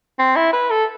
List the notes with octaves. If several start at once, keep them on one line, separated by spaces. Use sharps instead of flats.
C4
E4
B4
A4